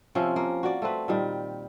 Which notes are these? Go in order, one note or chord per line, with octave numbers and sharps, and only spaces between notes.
C3 F3 C4 C#4
A#3
F#4 D5
A3 C4 B4
A#2 D#3 G3